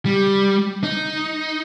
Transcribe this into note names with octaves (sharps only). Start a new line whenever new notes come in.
G3
D#4